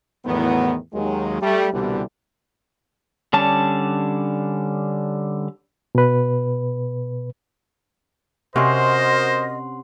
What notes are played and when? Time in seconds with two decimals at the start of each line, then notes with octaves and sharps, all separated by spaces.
0.25 E2 A2 D#3 F#3 B3
0.93 D#2 D#3 F#3 G#3
1.41 G3 A3
1.73 C2 B2 D3 E3 G3
3.33 D3 G3 C#4 D4 A5
5.95 B2 B4
8.56 C3 C#4 F#4 A#4 C5 D#5 F#5 C6